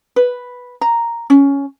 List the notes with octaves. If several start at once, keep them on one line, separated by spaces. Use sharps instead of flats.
B4
A#5
C#4